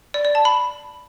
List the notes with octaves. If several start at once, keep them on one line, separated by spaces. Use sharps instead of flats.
D5
D5
A5
B5